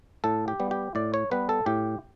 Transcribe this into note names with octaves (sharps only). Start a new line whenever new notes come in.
A2 A4
G4
G3 B3
G4
A2 D5
C#5
G3 B3 B4
A4
A2 G4